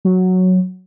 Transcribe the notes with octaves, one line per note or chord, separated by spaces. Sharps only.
F#3